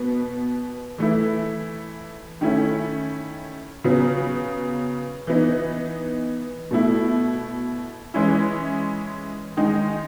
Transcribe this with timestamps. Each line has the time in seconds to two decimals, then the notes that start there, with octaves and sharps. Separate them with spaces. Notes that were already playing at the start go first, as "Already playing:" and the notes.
Already playing: B2 B3
0.98 E3 A3 E4
2.41 D#3 A3 C#4 E4
3.84 C#3 F#3 B3
5.27 E3 B3 D#4
6.71 B2 A3 E4
8.14 E3 G#3 C#4 E4
9.57 D#3 G#3 D#4